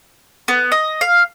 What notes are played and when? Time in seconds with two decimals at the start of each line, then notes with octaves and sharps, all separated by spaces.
0.48 B3
0.72 D#5
1.01 F5